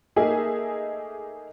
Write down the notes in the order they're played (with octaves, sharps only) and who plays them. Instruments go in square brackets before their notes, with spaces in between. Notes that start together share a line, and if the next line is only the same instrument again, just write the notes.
[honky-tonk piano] A3 A#3 D#4 G#4 E5 G#5